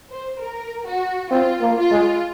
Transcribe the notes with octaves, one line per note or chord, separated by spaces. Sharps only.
C5
A#4
F#4
C4 F4
A#3
F4
G#3